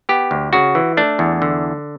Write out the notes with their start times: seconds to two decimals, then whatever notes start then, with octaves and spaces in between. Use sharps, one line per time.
0.09 B3 G4
0.31 D2
0.53 C#3 F#4
0.75 E3
0.97 A3 D4
1.19 E2
1.42 D3